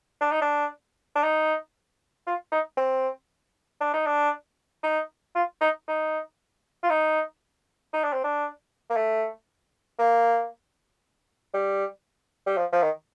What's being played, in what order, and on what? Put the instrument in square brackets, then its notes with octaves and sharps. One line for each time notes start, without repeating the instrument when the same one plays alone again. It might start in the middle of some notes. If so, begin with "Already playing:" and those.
[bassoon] D4
D#4
D4
D4
D#4
F4
D#4
C4
D4
D#4
D4
D#4
F4
D#4
D#4
F4
D#4
D#4
D4
C4
D4
A#3
A3
A#3
G3
G3
F3
F3
D#3